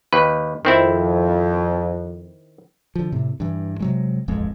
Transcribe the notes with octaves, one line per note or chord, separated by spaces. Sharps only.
D#2 B4
F2 D#3 C4 E4
D3 F3
A2 C3
G2 E3
C3 F#3 G#3
D#1 A1 F2 G#3